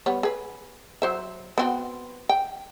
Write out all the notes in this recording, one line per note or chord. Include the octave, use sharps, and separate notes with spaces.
G3 B3 C#5
G#4 B4
F#3 C5 E5
B3 C4 F#4
G5